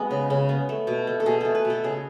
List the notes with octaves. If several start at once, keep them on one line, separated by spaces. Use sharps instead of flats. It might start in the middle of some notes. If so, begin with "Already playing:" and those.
Already playing: G#3 B3 F#4
C#3
C#3
B3
A3
B2
A3
A4
B2 G#4
A3 A4
B4
B2
A4
C#3 G#4